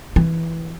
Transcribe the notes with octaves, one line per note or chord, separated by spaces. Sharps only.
E3